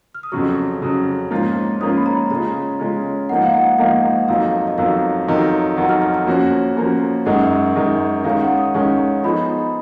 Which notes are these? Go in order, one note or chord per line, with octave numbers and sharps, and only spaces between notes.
F6
D#6
F2 C#3 F#3 C#6
F2 C#3 F#3
G#2 F3 A#3 C#4 F4
G#2 F3 A#3 C#4 F4 D#6
B5
A#5
C#3 G#3 C#4 F4 A#5
C#3 G#3 C#4 F4
G#2 F3 A#3 D#4 F#5
F5
F#5
G#2 F3 A#3 D#4 F5
F2 D#3 F#3 F5
D#5
F2 D#3 F#3 F5
F2 D#3 F#3
F2 D#3 F#3 F#5
F6
F6
F6
F3 A#3 C#4 F#4
F3 A#3 C#4 F#4
F#2 D#3 G#3 F#5
F#2 D#3 G#3 D#5
D#3 G#3 C#4 F5
F#5
D#6
D#3 G#3 C#4 C#6
F3 B3 D#4 G#4 B5